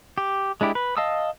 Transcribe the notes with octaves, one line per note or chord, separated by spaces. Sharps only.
G4
G#3 D4 E4 G4
B4
D#5 F5 A5 D#6 E6